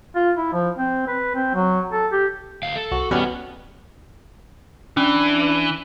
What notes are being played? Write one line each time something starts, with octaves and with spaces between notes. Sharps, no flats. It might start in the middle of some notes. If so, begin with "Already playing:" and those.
F4
E4
F3
C4
B4
C4
F#3
A4
G4
D2 F5
A4
C2 F#4
E2 B2 G3 B3 C#4 F#4 F#5 F6
E3 C#4 D4